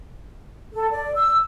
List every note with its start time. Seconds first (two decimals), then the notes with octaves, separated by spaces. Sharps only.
0.73 A4
0.91 D5
1.15 E6